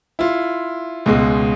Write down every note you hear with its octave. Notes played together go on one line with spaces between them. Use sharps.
E4 F4
C#2 B2 G#3